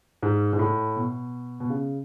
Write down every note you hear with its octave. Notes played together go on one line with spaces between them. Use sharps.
G#2
G#2
A2
B2
B2
C#3